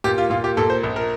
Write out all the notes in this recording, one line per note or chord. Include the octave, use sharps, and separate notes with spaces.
A#2 G4
F4
A#2 F4
G4
A#2 A4
C5
A#1
A#4